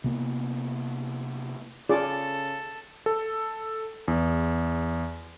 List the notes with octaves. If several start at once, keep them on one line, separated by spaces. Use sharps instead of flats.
C3 A#3 B3
C#3 F4 G#4 A4 D5
A4
E2